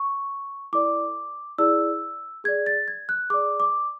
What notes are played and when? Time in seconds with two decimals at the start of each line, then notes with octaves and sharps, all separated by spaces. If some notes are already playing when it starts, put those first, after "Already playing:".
Already playing: C#6
0.73 E4 A4 D5 D6
1.58 E4 G#4 D5 E6
2.44 G#4 D5 G#6
2.66 A6
2.88 G#6
3.09 F#6
3.30 G#4 D5 D6
3.60 D6